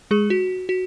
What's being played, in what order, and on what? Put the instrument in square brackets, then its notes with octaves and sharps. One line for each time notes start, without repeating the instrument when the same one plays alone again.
[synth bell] G#3 G#4
F#4
F#4